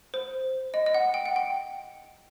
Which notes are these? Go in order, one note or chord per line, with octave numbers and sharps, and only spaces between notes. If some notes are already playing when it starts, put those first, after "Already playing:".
C5
D#5
D#5
F#5
G5
F#5
G5